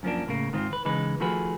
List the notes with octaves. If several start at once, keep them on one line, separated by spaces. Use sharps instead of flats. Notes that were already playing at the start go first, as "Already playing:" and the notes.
F#2 F3 A#3 D4
A2 C#3 A#3
G#2 D#3 C4 F4
B4
C#3 E3 G#3 D#4 B4
D#3 F3 A3 F#4 G#4 B4